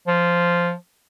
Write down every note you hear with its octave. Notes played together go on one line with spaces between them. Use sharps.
F3